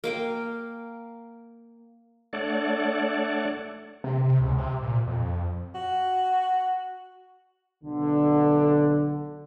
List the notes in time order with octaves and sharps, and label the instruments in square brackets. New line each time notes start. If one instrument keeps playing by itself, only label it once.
[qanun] A#3 F5 G5
[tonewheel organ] A3 D4 A4 C#5 D5 F#5
[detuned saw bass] C3
C3
C#2
C3
A#2
F2
[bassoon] F#4
[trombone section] B1 D3